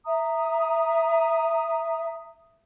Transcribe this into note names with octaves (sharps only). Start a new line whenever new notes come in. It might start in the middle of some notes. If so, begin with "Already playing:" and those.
E5 A#5 D#6